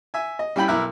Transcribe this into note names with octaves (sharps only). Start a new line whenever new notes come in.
E5 G#5
D#5
G3 C#4 E4 G5 B5
B1 E4 A#4 E5 D6 F#6